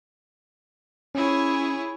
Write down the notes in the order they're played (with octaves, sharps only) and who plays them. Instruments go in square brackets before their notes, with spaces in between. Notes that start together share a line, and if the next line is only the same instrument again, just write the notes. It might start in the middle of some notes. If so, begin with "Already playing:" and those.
[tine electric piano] C#4 [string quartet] E4 G#4 C#5